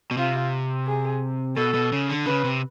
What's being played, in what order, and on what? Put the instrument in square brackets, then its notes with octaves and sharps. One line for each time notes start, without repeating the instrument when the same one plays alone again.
[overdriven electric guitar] B2
[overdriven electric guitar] C3 [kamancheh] F4
[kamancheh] G#4
[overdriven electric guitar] B2 [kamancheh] A4
[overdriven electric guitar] B2
C#3
D3
[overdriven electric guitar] C#3 [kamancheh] B4
[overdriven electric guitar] C3